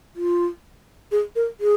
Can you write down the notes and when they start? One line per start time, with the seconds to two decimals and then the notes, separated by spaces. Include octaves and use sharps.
0.16 F4
1.12 G#4
1.36 A#4
1.60 G#4